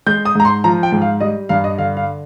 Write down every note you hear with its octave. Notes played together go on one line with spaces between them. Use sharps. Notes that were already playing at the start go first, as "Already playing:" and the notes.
G#3 G6
D#6
G#2 A#5
C6
F3 A#5
G5
G#2
F5
G3 D#5
G2 F5
D#5
D3 F5
F5